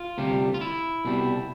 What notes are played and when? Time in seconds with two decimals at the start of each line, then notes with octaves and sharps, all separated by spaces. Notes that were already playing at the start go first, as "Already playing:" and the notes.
Already playing: F4
0.18 D2 C3 G3
0.54 F4
0.61 E4
1.05 C2 B2 G3